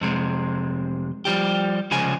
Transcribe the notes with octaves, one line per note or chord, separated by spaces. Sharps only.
F2 C3 G#3
F3 G3 G4
C2 C#3 F3 G#3 G#5